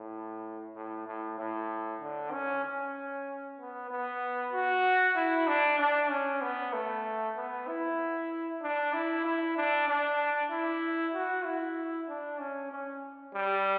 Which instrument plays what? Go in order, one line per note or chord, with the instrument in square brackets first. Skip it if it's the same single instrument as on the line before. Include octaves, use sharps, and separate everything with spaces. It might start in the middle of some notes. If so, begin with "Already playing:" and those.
Already playing: [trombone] A2
A2
A2
A2
D3
C#4
C#4
B3
B3
F#4
E4
D4
D4
C#4
B3
A3
B3
E4
D4
E4
E4
D4
D4
E4
F#4
E4
D4
C#4
C#4
G3